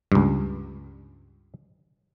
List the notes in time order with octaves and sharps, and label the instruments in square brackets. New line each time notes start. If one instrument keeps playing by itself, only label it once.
[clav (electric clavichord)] C#2 G2